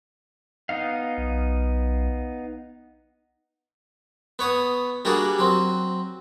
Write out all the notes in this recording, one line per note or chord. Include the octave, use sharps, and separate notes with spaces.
B3 D#4 F5
B1
B3 C#5 D#6
G3 A#3 D4 F#4 G#4
F#3 C4